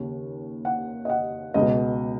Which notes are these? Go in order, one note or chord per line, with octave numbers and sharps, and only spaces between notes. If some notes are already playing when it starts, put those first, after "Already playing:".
Already playing: D#2 C#3
F#5
D#5
F#5
C#2 B2 D#5